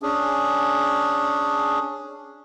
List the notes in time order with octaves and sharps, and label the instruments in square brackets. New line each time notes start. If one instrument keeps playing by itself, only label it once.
[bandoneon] C#4 D4 G#4